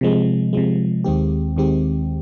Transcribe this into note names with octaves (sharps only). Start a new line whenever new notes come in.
C3 F3 G#3
C3 F3 G#3
D#2 D#3 G#3 C4 G4
D#2 D#3 G#3 C4 G4